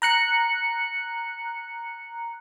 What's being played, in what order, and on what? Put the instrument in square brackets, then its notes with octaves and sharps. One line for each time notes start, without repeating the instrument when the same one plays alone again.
[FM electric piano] A#5 F#6 C#7